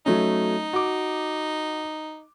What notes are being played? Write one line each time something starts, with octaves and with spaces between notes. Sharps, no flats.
F#3 A3 C#4 D#4
F#4 D6